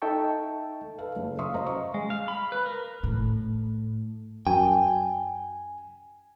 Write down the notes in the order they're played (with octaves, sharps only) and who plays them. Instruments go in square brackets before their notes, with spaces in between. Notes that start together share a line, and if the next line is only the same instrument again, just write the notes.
[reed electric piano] D#4 A4 E5 G5 A5 C#6
[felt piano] A4 B4 F5
F#1
E5 F5 C6 C#6 D#6
F#2 C5 D#5 A#5
C#6
[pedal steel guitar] G#3
F5
B5
B4
A#4
[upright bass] A2
[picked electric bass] F#2 [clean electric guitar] G5 [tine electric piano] G#5